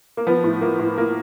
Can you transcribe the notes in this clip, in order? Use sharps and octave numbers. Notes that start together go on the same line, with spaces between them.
A#3
F3 B3
A2
F3 A#3
A2
A2 A#3